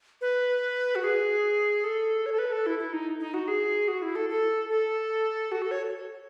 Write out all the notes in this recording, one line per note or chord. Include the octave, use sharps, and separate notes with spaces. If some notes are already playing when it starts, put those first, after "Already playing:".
B4
F#4
G#4
A4
C#5
A4
B4
A4
E4
E4
D#4
D#4
F#4
G#4
F#4
E4
A4
A4
A4
F#4
A4
C#5